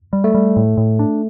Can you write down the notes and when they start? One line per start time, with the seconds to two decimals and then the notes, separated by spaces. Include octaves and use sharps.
0.13 G3
0.24 A3
0.34 G3
0.56 A2
0.77 A2
0.99 D4